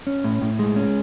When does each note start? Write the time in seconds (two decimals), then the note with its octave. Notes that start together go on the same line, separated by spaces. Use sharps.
0.07 C#4
0.24 A2
0.42 A2
0.59 G#3
0.76 C#4